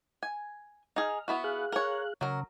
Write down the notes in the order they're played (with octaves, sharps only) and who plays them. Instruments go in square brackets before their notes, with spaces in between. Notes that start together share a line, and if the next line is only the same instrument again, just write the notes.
[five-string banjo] G#5
[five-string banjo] D#4 G#4 [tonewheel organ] F6
[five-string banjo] B3 E4 F#4
[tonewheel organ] G#4 F5 F#6
[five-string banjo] A#4 C#5
[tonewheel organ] C#3 [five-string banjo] F#3 A#4